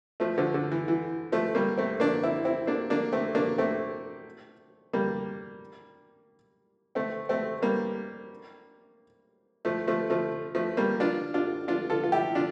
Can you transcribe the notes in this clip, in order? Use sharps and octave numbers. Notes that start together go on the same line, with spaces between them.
F3 A3
D3 F3
D3
E3
E3
F3 A3
G3 A#3
A3 C4
A#3 D4
C4 E4
C4 E4
A#3 D4
A#3 D4
A3 C4
A#3 D4
A3 C4
G3 A#3
A3 C4
A3 C4
G3 A#3
F3 A3
F3 A3
F3 A3
F3 A3
G3 A#3
D4 F4
D4 F4
D4 F4
F4 A4
F4
E4 G4
D4 F4